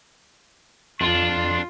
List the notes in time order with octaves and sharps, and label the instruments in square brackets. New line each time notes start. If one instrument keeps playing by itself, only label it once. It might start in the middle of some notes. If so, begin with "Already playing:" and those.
[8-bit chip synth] F2 [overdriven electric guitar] D4 [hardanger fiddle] F4 [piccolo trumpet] C6